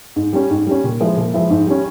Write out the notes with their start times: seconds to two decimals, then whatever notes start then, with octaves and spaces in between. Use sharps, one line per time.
0.16 G#2
0.33 G3 C#4
0.51 G#2
0.66 G3 C#4
0.84 A#2
1.00 F3 G#3 E4
1.17 A#2
1.34 F3 G#3 E4
1.50 G#2
1.67 G3 C#4